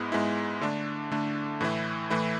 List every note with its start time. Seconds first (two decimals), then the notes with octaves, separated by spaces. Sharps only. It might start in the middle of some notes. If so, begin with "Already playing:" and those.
Already playing: G#2 G#3 B3 E4
0.12 G#2 G#3 B3 E4
0.61 D3 A3 D4
1.11 D3 A3 D4
1.61 A2 E3 A3 E4
2.10 A2 E3 A3 E4